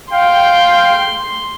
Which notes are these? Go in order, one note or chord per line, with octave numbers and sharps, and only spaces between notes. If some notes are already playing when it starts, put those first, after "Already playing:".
F5 G5 C6